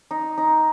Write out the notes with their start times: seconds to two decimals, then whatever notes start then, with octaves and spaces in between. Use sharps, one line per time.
0.11 D#4
0.38 D#4